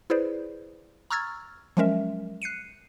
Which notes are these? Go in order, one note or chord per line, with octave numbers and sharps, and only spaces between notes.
E4 G#4 B4 C5 D5
A#5 C#6 E6 F6 G#6 A6
F3 F#3 G#3 C#4 A#4 E5
F#6 C7 C#7 D#7